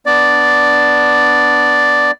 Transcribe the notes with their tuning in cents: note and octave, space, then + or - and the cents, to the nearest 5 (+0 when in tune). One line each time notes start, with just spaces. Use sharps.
B3 +0 D4 +0 D5 +0